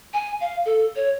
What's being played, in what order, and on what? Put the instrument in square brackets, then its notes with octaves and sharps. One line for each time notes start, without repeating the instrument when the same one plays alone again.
[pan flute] G#5
F5
A4
C#5